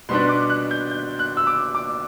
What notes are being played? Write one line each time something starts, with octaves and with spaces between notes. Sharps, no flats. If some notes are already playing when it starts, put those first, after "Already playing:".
B2 G3 B3 D4 C6
D6
F#6
G6
G6
F#6
E6
D6
D6